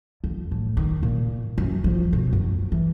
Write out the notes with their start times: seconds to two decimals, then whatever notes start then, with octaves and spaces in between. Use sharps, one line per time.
0.24 F2
0.51 A2
0.77 D#3
1.03 A#2
1.58 F#2
1.84 F3
2.13 B2
2.33 F#2
2.72 E3